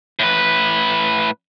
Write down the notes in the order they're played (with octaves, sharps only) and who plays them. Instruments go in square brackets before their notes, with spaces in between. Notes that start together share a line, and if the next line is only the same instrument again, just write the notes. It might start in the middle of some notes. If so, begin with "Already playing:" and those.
[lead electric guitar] A2 B4